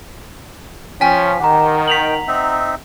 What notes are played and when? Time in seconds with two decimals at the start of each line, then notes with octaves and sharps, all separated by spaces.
1.01 F3 C#4 G5 G#5 B6
1.40 D#3 G4 F#5 A#5
1.88 G5 B6 F7 F#7
2.28 C4 D#4 E5